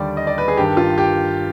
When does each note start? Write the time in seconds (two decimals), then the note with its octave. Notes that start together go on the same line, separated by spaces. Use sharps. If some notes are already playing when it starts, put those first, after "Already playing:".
Already playing: D#2 D3 G3 D5
0.17 D#5
0.27 D5
0.38 B4
0.48 G#4
0.57 G1 G2 D#3 G4
0.77 F4
0.98 G4